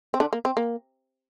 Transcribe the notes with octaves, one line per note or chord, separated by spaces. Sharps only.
C4
D3 D4
A#3
C4
A#3